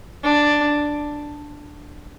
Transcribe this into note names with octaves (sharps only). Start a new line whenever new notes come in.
D4